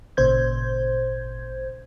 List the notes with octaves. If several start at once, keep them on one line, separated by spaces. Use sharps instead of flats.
G#1 A#2 C#3 C5 G6 G#6